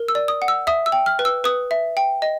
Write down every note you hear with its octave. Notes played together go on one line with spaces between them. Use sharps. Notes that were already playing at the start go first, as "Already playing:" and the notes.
Already playing: A#4
E6
D5
D#6
F#5
E6
E5 D#6
E6
G5
F6
B4
E6
B4 D#6
E5
G5
D#5